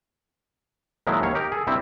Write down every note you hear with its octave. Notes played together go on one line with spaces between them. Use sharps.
A#2 D#3 F3 F#3 G#3 E4
D#2 C#5 F5
D#4 G4 A#4
G#4 A4
G2 C3 G3 C4 E4